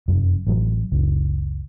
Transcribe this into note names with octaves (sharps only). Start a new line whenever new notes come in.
F1 F#2
A1 F#3
F#1 C#2